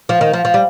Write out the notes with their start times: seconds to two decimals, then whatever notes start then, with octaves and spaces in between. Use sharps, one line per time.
0.09 F3
0.21 D#3
0.33 F3
0.45 F3
0.54 G3